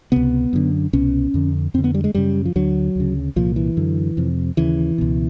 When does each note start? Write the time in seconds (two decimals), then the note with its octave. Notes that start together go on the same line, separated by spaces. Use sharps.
0.12 C#2 C3 B3
0.53 F#2 D3
0.93 C2 B2 C#4
1.34 F2 D3
1.74 F2 C4
1.78 D3
1.84 B3
1.95 G3
2.04 G#3
2.15 F#2 C#3 G3
2.45 F3
2.55 D2 D3 F#3
2.95 D2 C#3
3.36 C2 A#2 F3
3.56 E3
3.77 F#2 D3
4.17 F2 C3
4.57 D#2 C#3 E3
4.98 C#2 B2